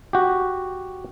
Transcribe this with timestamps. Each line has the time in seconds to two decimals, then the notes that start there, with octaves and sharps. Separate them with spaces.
0.13 F#4 G4